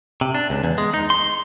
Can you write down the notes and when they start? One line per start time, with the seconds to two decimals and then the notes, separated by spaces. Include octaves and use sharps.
0.21 C3
0.35 D4
0.50 C#2
0.64 E2
0.78 G#3
0.94 D#4
1.10 C6